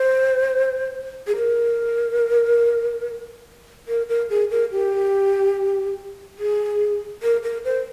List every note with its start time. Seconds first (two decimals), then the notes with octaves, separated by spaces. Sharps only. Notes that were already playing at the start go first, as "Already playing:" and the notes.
Already playing: C5
1.27 G#4
1.36 A#4
3.88 A#4
4.09 A#4
4.30 G#4
4.51 A#4
4.71 G4
6.39 G#4
7.23 A#4
7.43 A#4
7.65 C5